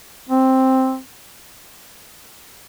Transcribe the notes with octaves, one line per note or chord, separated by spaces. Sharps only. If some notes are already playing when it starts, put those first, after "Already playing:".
C4